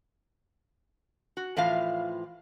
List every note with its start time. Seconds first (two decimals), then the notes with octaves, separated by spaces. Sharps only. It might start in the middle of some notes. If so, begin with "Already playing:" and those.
1.37 F#4
1.57 A2 E3 F3 F4 F5